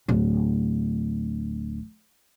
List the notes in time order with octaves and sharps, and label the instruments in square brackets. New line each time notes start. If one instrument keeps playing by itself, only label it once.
[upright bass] D1 D3